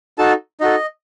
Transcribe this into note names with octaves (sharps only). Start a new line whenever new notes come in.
D#4 F#4 A4 A5
D#4 F#4 A4 D#5